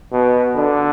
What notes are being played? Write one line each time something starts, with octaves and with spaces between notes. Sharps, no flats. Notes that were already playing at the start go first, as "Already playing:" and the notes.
B2
D3